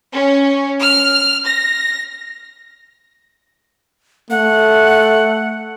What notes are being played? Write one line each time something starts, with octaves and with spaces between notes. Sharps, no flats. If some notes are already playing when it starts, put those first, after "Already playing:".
C#4
F6
A#6
A3 F#5